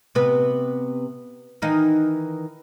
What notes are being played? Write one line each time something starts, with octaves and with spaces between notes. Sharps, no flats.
C3 B3 B4
D#3 E3 D#4